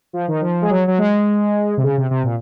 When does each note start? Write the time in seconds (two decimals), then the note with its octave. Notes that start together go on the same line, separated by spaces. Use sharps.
0.13 F3
0.28 D#3
0.41 F3
0.62 G#3
0.70 F#3
0.88 F#3
0.98 G#3
1.77 C3
1.83 C#3
1.98 C3
2.11 C3
2.24 A#2